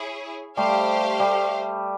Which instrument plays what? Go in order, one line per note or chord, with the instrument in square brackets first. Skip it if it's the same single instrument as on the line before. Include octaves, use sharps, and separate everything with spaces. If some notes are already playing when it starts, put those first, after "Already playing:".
Already playing: [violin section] E4 G#4 C#5
[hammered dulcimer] G3 A3 [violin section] G4 C5 F5
[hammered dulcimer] G3 A3